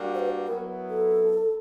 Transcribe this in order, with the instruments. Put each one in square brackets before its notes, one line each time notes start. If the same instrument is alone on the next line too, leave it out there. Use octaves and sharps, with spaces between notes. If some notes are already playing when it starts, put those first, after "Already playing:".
Already playing: [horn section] G3 A#3 D4 F#4
[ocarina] C5
B4
[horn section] F#3 B3 E4 [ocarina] A#4
[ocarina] A4